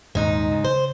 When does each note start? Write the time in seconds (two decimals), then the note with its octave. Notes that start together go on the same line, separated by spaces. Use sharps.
0.15 D#1 D#2 G#2 D#4
0.51 C#3
0.65 C5